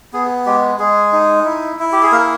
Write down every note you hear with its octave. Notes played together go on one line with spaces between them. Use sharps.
B3 G#4
G#3 G4
G#3 G#4
D#4
E4
E4
G4
G#4
A#3 A#4